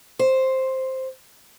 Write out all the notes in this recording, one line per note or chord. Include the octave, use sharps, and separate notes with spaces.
C5